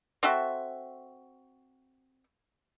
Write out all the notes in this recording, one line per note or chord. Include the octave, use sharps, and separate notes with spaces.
C4 F#4 A4 E5